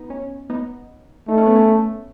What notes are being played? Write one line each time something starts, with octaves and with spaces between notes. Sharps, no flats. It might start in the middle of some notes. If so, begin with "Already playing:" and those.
Already playing: B3 D#4
C#4
B3 D#4
A3 D#4
C#4
B3
C#4